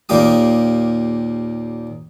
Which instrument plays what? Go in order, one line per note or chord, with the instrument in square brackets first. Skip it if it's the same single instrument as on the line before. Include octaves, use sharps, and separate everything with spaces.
[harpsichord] D#2 A#2 A#3 G4 D#6